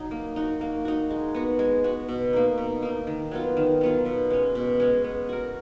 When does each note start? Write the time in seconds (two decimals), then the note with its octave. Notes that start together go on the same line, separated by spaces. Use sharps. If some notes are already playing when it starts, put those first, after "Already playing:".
Already playing: F#3 D#4
0.11 A#3
0.36 D#4 F#4
0.61 A#3
0.85 D#4 F#4
1.10 G#3
1.34 B3 F#4
1.59 G#3
1.84 B3 F#4
2.08 B2
2.33 A#3 D#4
2.58 B2
2.82 A#3 D#4
3.07 D#3
3.31 F#3 B3 F4
3.57 D#3
3.81 F#3 B3 F4
4.05 B2
4.30 G#3 C#4
4.55 B2
4.80 G#3 C#4
5.04 B3
5.29 F#4 A#4